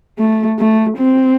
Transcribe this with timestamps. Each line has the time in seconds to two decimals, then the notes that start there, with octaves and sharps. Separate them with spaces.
0.19 A3
0.59 A3
0.98 C4